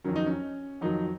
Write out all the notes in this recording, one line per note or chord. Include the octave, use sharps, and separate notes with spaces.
F2 D#3 F#3 C#4
D#4
C#4
F2 D#3 F#3 D#4